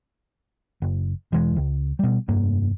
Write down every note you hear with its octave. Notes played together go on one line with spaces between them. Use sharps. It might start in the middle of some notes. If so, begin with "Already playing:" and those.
F#1
E1 E2 E3 G#3
C#2
B2 G3
F1 G2 A#3